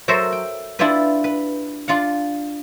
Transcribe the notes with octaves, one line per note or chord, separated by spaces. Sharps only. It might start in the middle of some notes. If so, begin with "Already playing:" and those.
F#3 F#4 A4 A#4 C5 E5
G5
D4 E4 F4 G4 B4
B4
D4 F4 F5 F#5